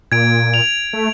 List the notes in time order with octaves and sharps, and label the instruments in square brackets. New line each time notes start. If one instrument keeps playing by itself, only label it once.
[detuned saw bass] A#2 [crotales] G#6 D7
[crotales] F7
[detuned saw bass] A3